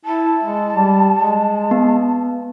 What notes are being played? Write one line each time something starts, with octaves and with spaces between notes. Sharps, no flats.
E4 A5
G#3
G3
G#3
B3